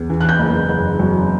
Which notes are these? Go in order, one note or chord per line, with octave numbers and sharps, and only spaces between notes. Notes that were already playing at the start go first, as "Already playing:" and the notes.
Already playing: E2
E3
F#6
G6
F#1
F#1
F#2